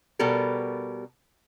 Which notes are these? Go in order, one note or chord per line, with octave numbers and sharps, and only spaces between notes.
B2 G3 B3 A4 A#4